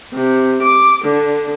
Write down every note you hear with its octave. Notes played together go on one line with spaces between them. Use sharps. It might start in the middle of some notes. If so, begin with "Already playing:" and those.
C3
D6
D3